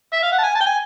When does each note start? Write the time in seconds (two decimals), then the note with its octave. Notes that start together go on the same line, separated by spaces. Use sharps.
0.13 E5
0.23 F5
0.32 F#5
0.39 A5
0.44 G#5
0.55 A5
0.61 G5
0.66 G#5